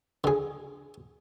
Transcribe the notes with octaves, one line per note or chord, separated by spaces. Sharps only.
D3 G#4